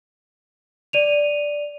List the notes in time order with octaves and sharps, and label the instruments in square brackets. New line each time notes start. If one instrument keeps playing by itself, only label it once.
[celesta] D5 D#7 F7